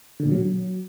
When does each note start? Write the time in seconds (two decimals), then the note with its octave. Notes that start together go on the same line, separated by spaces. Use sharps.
0.20 D3
0.26 A#2
0.32 F#3